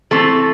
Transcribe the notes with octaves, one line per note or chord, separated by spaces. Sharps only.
E3 A3 C4 A4